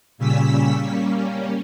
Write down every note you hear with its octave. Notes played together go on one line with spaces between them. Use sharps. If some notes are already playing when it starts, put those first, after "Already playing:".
A#2 C#3 G3 C#4 E6 B6
G3 A#3 C#4